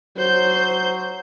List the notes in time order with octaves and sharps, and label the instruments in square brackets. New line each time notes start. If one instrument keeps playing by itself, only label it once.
[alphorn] F#3 [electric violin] C5 G6